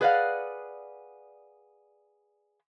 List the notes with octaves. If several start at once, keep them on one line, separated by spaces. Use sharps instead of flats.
G#4 B4 D5 D#5 F5 F#5